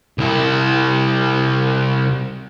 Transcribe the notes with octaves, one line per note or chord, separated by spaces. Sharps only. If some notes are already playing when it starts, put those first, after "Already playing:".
C2 E4